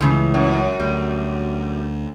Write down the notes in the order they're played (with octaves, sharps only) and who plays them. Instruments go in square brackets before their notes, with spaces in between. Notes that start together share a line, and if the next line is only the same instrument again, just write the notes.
[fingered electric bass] C#2 [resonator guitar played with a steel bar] A2 C#3 E3
[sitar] F#2
[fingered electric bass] D2 [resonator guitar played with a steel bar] G3